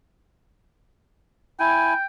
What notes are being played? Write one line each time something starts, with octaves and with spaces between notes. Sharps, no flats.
E4 G5 G#5